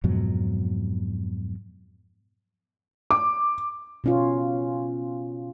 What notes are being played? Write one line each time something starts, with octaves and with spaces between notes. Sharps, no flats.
F2 G#2 B2 F#3
D6
B2 C#4 F4